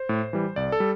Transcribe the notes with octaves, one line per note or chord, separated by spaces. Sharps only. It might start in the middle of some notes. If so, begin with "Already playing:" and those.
Already playing: C5
A2
E3 G3
C2 D5
A4
G3